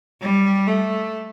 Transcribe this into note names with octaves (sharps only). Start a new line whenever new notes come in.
G3
A3